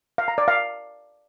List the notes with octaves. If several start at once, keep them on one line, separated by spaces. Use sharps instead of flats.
F5
A#5
D5
F5